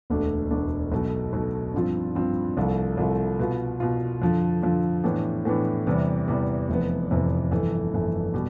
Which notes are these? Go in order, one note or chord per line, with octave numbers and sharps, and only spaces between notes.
E1 D2 D3 A3 D4
E1 D2 D3 A3 D4
B1 B2 A3
B1 B2 A3
G2 F3 C4 F4
G2 F3 C4 F4
C2 C3 F3 A3
C2 C3 F3 A3
B2 B3 F4
B2 B3 F4
F2 D3 F3
F2 D3 F3
A2 E3 B3 D4
A2 E3 B3 D4
E2 C3 E3 G3 B3
E2 C3 E3 G3 B3
F1 F2 C3 E3 B3
F1 F2 C3 E3 B3
G1 F2 E3 A3
G1 F2 E3 A3
B2 G3